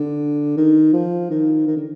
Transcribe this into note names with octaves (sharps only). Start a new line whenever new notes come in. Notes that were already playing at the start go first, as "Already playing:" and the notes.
Already playing: D3
D#3
F3
D#3
D#3
D3